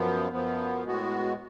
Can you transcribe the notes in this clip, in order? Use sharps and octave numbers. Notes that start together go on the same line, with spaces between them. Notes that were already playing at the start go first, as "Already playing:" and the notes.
Already playing: F#2 F3 B3
F#2 F3 B3
A2 G#3 B3 F#4